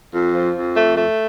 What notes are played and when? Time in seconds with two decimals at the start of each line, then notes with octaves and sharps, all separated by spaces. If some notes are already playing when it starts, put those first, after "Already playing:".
0.12 F2
0.33 F3
0.53 F2
0.75 A3
0.96 A3